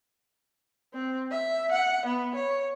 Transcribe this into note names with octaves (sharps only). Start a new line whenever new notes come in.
C4
E5
F#5
B3
C#5